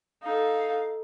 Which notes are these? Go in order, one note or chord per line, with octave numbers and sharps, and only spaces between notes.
D#4 A4 F5